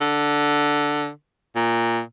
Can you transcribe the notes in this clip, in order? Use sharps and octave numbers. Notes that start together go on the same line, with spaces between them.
D3
A#2